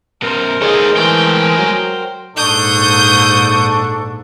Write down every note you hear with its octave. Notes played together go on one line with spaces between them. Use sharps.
F#2 B2 A#4 C5
D#3 A3 G#4 C#5 D#5
E3 G#3 A3 G5
F#3
A#1 G#2 D4 A4 C#6 D#6 G6